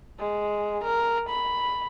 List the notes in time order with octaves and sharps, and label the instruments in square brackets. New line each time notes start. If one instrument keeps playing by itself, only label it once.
[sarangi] G#3
A#4
B5